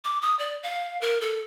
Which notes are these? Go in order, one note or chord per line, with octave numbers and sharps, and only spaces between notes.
D6
D#6
D5
F5
A#4
A4